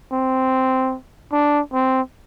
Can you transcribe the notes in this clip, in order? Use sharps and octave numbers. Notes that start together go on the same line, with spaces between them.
C4
D4
C4